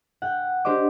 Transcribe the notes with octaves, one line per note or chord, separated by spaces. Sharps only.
F#5 G5
D4 G4 C5 D#5 D6